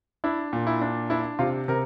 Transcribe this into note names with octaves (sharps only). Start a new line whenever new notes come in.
D4 E4
A#2
E4
D4
D4 E4
C3 F4
C3 A#4